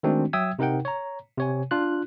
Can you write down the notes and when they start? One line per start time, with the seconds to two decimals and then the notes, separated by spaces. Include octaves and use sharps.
0.03 D#3 G#3 A3 C4 D4 F#4
0.33 F#3 E5 G5 D#6 E6 G#6
0.59 C3 D#4 A#4 F#5 G5
0.85 C#5 A#5
1.38 C3 C#5 G#5
1.71 D4 F4 F#6